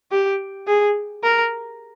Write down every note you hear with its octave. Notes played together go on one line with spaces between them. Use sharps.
G4
G#4
A#4